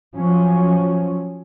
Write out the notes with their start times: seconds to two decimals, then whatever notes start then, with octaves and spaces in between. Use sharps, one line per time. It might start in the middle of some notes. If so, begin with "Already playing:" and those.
0.15 F3 F#3 C#4